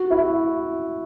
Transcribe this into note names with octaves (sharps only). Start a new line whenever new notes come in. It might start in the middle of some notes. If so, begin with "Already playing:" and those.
Already playing: F#4
E4